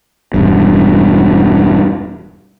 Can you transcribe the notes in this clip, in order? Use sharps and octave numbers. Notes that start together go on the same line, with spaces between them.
E1 G2